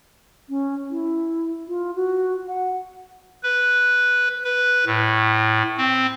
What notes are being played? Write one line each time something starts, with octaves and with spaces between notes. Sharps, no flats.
C#4
E4
F4
F#4
F#5
B4
B4
A2
C4